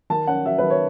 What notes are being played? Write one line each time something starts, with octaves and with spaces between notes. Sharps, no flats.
D#3 A5
C#4 F#5
F#3 E5
D#3 B4
C#5